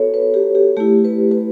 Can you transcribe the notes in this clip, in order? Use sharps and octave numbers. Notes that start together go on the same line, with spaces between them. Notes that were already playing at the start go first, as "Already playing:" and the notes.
Already playing: B3 F#4 A4 B4 C#5
B4
G4
G4
A3 E4 G4
B4
B4